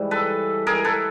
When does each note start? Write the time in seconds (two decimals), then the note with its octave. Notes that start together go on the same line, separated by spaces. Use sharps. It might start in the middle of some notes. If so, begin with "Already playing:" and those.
Already playing: G#2 E3 G3
0.11 A4 B4
0.67 G#4 A#4
0.84 A4 B4